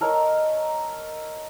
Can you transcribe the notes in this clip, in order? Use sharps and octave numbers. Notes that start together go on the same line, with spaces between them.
A4 A#4 C#5 D#5